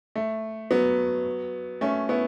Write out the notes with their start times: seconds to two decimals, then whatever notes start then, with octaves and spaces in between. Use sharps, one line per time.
0.16 A3
0.71 F#3 B3
1.81 A3 C#4
2.09 B3 E4